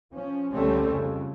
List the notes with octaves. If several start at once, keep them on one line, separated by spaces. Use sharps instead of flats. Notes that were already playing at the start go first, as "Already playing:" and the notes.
F3 C#4
C#2 D3 G3 A3 C4 C#4
F2 C#3